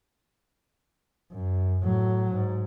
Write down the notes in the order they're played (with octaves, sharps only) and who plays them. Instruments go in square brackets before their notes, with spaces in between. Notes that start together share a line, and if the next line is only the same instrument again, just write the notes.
[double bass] F#2
A2 F#3
G#2